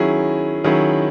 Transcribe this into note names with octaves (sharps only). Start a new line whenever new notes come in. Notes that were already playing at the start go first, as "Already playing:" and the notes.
Already playing: D#3 F#3 C#4 E4 G#4
D#3 F#3 C#4 E4 G#4